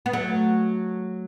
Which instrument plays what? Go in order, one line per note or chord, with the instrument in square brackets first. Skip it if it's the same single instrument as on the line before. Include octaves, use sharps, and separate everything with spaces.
[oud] B3
F#3 A3